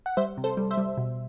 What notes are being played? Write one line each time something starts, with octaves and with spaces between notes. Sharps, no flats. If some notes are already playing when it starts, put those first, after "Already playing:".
F#5
G3 C5 E5
C3
A4 C5
G3
C5 E5
G3
B2